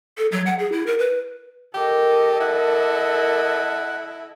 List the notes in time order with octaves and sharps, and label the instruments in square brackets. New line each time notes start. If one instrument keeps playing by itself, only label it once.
[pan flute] A4
F#3
F#5
G#4
E4
A#4
B4
[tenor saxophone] G4 [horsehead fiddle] A4 D#5 [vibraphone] A#4 D6
[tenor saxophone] E4 [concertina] F#5